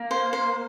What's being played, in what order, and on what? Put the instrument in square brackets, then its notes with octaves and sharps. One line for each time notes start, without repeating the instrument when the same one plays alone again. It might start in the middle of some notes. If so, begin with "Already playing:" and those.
Already playing: [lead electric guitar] A#3
[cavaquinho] C5
C5